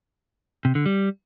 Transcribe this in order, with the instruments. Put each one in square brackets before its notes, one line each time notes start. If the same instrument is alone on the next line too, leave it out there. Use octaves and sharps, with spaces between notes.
[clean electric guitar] C3
D3
G3